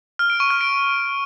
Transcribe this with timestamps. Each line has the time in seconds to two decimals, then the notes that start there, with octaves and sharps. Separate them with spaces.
0.19 F6
0.30 D7
0.40 C#6
0.50 F6
0.61 D7